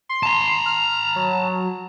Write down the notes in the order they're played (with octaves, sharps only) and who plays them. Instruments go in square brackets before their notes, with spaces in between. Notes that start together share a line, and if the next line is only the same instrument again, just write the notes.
[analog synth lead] C6
[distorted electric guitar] A5 A#5
[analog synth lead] F6
F#3